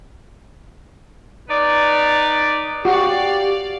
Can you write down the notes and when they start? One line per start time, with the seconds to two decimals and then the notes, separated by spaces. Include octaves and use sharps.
1.49 D#4 B4 D5
2.85 F#4 G4 D5 F5